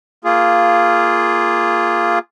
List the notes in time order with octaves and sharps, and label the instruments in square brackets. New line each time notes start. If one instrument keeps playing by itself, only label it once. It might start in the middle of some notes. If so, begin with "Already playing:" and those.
[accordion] A#3 F4 G#4